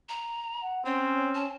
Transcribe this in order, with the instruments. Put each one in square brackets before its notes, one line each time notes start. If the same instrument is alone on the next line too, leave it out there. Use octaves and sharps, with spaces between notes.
[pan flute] A#5
[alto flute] F#5
[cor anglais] C4 [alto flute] C#4 [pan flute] C#5
[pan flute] A5